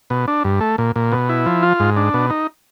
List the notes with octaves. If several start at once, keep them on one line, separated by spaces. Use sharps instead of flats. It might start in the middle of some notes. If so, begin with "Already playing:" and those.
B2
D4
G2
A3
A#2
A#2
B2
E4
F3
F4
G#2
D4
B2
D#4